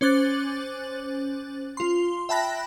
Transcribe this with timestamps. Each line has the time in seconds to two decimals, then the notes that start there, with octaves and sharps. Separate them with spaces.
0.01 C#4 C5 D6 F#6 A6 F#7
1.77 F4 C6
2.29 E5 G5 A5 B5 F#6 A#6